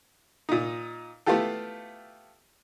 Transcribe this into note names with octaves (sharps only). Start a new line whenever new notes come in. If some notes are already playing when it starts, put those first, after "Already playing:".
A#2 D#4
A3 B3 E4 F4 G4 A4